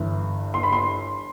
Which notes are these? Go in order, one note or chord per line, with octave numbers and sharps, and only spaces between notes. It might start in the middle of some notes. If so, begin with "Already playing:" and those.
Already playing: G1 G2 E3
C6
B5
C6